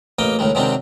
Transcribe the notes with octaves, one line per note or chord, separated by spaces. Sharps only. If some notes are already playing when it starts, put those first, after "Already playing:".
A1 A#3 D#5 G5
C#2 A2 D#3 G#3
F#2 C3 D#3 G#3 C4 D4